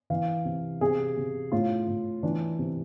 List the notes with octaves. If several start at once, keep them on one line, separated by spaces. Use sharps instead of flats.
E3 F5
C3
C3 G#4
C3
A2 F4
A2
E3 D4
C3